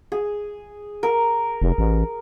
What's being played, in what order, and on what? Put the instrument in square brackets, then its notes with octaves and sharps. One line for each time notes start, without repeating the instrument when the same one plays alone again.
[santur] G#4
A#4
[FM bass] F1
A1